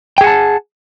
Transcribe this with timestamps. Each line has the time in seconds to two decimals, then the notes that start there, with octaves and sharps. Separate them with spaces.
0.18 G5
0.21 G#4
0.24 F#5
0.27 A5